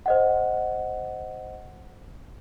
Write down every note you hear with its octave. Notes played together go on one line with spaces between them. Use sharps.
C5 D#5 F#5